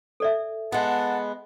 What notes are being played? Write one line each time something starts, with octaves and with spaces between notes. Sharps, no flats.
A4 D5 E5
G#3 B3 F#5 A5